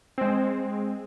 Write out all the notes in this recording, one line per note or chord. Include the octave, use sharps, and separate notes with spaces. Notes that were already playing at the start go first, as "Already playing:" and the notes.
G#3 C4